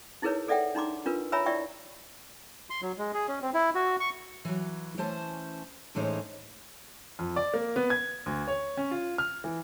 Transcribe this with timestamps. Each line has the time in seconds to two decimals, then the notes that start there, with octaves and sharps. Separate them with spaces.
0.22 D#4 E4 G#4 A#4 B4 C#5
0.48 G#4 A4 D5 E5 F#5 G5
0.75 D4 D#4 A#5 C6 D6
1.06 D4 F4 A#4 B4
1.32 C#5 E5 G#5 A#5 B5 E6
1.46 E4 D5 E5 G5 C#6
2.70 C6
2.82 F#3
2.98 G#3
3.14 G#4
3.28 C#4
3.42 C4
3.54 E4
3.75 F#4
4.00 C#6
4.45 E3 F#3
4.97 E3 A3 C#4 C5 A5
5.95 A2 E3 G#3 C#4 D#4 C5
7.19 F2
7.36 D5
7.54 A#3
7.76 B3
7.90 G#6
8.26 D2
8.48 C#5
8.77 C#4
8.91 F4
9.18 F6
9.44 E3